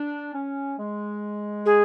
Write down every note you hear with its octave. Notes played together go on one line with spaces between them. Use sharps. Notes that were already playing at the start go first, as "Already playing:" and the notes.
Already playing: D4
C#4
G#3
G#4